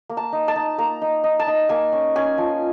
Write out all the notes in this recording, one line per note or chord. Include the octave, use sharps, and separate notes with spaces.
A#3
A5
D#4
A5
D#4
A#3 A#5
D#4
D#4
A5
D#4
A#3 G#5
C#4
C#4 G#5
F3